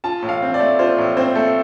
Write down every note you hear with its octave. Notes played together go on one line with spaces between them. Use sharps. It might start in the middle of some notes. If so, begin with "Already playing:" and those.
F4 A5
A2
F5
C4
D5
A3
F4 C5
A2
C4 C5
A3 A4